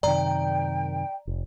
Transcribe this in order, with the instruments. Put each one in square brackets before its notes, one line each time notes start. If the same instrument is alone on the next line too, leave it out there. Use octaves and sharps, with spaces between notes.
[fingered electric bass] F#2 C3 D#3 [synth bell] D5 A#5 [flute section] G5
[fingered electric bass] F1